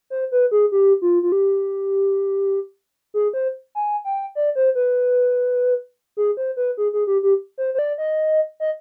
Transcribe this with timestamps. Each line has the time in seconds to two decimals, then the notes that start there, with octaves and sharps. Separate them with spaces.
0.10 C5
0.32 B4
0.51 G#4
0.72 G4
1.02 F4
1.23 F4
1.32 G4
3.14 G#4
3.34 C5
3.75 G#5
4.05 G5
4.35 D5
4.55 C5
4.75 B4
6.17 G#4
6.37 C5
6.57 B4
6.77 G#4
6.93 G#4
7.07 G4
7.23 G4
7.58 C5
7.74 C5
7.79 D5
7.98 D#5
8.60 D#5